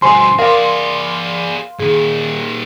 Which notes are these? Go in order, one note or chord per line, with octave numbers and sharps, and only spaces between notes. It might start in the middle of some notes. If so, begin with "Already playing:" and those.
G2 B2 C5 G#5 C6
G#4 A#4 D5 F5
A#2 D#3 G#4